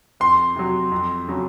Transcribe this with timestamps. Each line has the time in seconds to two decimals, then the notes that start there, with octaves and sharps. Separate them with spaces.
0.20 F2 C6
0.56 C3 F#3
0.92 F2
1.27 C#3 F#3 C#4